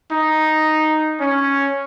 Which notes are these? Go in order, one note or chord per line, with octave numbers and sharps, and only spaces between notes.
D#4
C#4